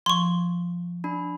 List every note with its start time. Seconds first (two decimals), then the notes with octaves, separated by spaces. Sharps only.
0.06 F3 C6 C#6
1.04 D4 B5